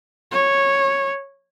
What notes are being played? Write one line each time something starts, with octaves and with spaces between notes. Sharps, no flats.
C#5